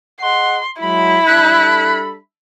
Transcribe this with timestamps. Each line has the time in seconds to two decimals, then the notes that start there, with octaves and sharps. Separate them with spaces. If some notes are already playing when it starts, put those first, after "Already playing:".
0.21 G#4 D#5 F#5 C6
0.82 F#3 G#3 E4 B5
1.27 G3 D4 A4 F#6